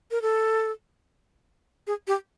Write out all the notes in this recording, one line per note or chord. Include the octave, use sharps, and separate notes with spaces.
A#4
A4
G#4
G4